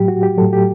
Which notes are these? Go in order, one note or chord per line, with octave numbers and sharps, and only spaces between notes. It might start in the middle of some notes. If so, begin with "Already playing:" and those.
Already playing: A2 F#3 G4
F#4
G4
A2 F#3 A4
G4